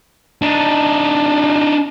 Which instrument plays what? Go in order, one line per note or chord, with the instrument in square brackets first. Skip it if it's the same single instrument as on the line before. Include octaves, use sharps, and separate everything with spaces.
[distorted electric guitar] D4 D#4